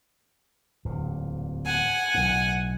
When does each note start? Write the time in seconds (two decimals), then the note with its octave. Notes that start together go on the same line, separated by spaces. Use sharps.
0.85 D1 E2 A#2
1.66 F#5 G#5
2.14 B1 A2